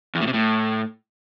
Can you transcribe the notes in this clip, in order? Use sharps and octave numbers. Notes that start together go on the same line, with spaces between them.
E2
A2
C3
A2